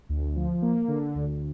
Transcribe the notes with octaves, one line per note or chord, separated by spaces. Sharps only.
D2
F3
A#3
D3
D2